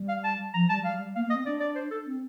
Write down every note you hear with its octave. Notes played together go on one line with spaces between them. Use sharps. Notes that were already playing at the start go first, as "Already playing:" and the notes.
Already playing: G3
F5
A5
F3 A#5
G3 A5
G3 F5
G3
A#3 F5
A#3
D#5
C4
D4 D5
D5
C5
A4
C4